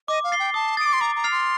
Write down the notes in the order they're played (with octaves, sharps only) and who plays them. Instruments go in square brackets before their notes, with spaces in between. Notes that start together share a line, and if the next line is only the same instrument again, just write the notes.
[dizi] D#5 [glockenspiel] D6
[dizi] F5
[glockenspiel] A6 C7 G7
[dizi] G5
[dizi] A5 [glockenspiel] D#6
[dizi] D#6 [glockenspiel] A6
[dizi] D6 [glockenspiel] D7
[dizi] C6
[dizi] A#5 [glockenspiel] D6
[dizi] A#5
[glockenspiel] F6 A6 C7 F7
[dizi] C6